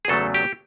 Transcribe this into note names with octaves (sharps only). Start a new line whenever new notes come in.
G#4
E2 C#3 F#3 A3 A4
G4